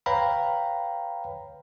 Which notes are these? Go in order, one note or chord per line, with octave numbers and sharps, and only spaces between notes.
B4 C#5 F5 G5 A#5 B5